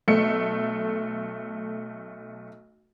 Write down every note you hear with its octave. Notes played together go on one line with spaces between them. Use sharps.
B1 A3 C#7